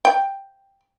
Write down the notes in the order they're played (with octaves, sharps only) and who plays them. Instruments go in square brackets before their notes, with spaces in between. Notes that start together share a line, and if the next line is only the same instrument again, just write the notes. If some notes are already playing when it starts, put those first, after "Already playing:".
[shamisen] G5